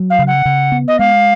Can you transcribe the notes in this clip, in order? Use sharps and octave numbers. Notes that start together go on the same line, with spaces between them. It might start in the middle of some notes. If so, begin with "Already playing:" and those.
Already playing: F#3
F5
C#3
F#5
C#3
B3
D#5
G#3 F5